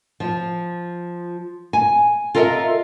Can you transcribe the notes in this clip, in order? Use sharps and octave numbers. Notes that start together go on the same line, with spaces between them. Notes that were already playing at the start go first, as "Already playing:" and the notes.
F3
G#5
F4 A4 A#4 D#5 E5